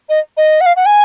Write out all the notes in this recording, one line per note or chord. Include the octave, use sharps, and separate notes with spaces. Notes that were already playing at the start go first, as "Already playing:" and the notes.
D#5
D#5
F#5
F5
F#5
G#5